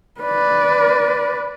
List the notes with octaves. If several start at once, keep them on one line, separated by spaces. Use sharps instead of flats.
B4 D5